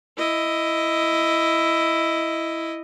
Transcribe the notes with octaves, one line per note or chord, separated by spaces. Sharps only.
E4 D#5